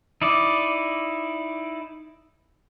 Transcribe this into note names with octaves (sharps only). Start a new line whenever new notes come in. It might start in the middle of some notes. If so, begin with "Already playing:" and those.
D#4 E4 D5